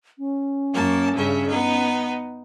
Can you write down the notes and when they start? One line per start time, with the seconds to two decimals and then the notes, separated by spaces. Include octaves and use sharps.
0.18 C#4
0.74 F#2 A#3 A5
1.15 G2 C#3 E5
1.48 B3 D#4